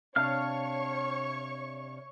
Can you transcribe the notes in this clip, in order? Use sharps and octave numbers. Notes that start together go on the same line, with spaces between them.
C3 D4 C#5 F5 C#6 F6